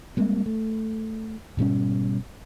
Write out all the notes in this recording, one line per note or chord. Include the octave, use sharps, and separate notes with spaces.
G3 G#3 A#3 C4
A3
G#2 B2 G3 C#4